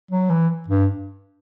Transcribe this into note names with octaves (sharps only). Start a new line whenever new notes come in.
F#3
E3
G2